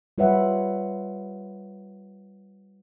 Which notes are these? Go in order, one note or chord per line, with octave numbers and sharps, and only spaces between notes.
G3 F4 B4 C#5 E5 F#5